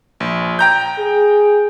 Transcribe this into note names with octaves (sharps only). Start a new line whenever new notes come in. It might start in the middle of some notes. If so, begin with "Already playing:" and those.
A#1
G5 A#5 G6
G#4